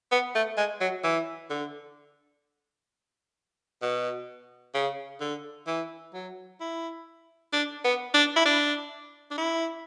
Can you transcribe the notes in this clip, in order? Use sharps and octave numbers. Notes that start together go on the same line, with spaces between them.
B3
A3
G#3
F#3
E3
D3
B2
C#3
D3
E3
F#3
E4
D4
B3
D4
E4
D4
D4
E4